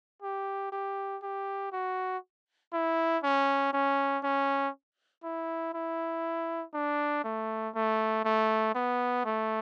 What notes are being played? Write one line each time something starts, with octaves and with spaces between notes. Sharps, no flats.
G4
G4
G4
F#4
E4
C#4
C#4
C#4
E4
E4
D4
A3
A3
A3
B3
A3